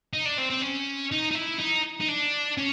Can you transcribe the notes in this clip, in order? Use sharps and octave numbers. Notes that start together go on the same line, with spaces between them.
D#4
D4
C4
C4
C#4
D#4
D#4
E4
D#4
D#4
D4
C#4